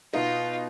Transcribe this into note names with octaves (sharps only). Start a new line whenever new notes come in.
B2 B3 D#4 F4